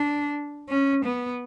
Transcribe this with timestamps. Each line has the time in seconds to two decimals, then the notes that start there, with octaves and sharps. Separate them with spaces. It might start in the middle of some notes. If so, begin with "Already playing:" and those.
Already playing: D4
0.69 C#4
1.05 B3